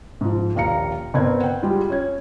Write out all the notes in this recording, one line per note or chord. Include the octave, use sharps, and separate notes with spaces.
G#2 F3
D#1 A#1 F5 A#5 C#7
G1 C4 A#4 G#6
F#5 G5
G3 G#3 F4 G4
C#4 G#6